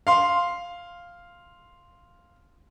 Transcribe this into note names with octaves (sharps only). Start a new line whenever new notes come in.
F5 C6